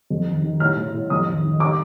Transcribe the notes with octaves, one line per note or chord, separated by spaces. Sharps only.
F2
D#3
D#3
A2 F6
A2
A2
F2 D#6
D#3
D#3
D6